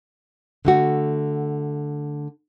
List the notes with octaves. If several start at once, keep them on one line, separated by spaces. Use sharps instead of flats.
D3 A3 F#4